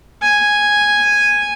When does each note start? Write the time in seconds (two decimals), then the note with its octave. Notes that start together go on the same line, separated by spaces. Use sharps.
0.22 G#5